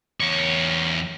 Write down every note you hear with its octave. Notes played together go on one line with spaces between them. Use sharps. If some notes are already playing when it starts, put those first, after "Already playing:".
E2 C#5